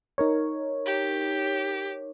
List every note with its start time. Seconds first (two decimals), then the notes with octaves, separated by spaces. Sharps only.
0.18 D#4 A#4 C#5
0.86 G4